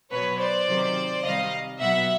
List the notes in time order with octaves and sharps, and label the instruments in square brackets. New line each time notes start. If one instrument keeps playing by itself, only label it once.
[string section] B2 F#3 B4 C#5
C5 D5
C3 D#3 F#3
C3 D#3 G3 D#5 F5
B2 F#3 E5 F#5